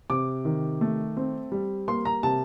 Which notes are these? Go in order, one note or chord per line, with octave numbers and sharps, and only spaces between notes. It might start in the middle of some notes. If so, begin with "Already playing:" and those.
C3 D6
D#3
A3
C4
G3
A#3 C6
A#5
C3 A5